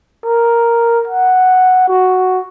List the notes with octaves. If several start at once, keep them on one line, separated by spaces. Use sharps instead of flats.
A#4
F#5
F#4